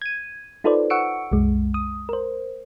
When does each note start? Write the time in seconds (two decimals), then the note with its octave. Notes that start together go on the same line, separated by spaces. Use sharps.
0.02 G#6 D#7
0.64 D#4 F4 A4 B4 C5 D5
0.90 F#5 C#6 E6 C#7 D7
1.32 C2 F#2 G#3
1.74 D#6
2.09 A#4 C5